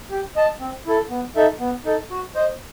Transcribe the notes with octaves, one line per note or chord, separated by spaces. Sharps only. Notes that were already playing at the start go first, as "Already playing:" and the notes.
G4
D#5 A5
C4
E4 A4
B3
D#4 A4 E5
B3
D#4 A4
F#4
C5 D#5